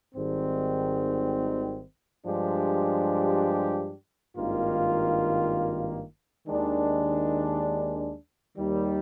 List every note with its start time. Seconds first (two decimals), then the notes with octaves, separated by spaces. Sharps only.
0.13 G#1 G#2 D#3 G3 C4
2.24 G2 F3 G#3 D4 G4
4.35 G#1 G2 D#3 A#3 F4
6.46 D#2 D#3 G#3 D4
8.57 D#2 D#3 G3